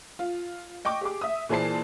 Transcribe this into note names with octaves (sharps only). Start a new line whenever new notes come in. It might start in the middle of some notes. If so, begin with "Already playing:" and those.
F4
D#5 G5 C#6 D6
G4 G#4 D6
E5 D#6
A#2 E3 G#4 C5 A5 C7